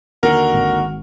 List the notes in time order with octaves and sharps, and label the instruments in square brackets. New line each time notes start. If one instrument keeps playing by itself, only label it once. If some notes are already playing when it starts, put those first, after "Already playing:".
[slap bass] D#2 D3 [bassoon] F#4 [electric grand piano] A#4
[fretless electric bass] G#1